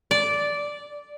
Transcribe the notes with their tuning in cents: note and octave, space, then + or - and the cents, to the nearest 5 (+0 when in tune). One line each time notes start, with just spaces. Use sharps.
D5 -10